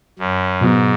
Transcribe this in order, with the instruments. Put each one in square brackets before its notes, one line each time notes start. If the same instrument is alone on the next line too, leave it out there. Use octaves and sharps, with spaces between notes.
[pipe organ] F#2
[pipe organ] G#2 [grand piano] B2 F#3 B3